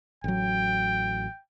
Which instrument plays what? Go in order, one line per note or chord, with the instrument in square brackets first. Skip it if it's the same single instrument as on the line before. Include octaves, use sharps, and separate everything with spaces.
[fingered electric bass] A1 F#3 [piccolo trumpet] G5